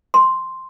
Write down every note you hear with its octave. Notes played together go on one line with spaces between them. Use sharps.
C6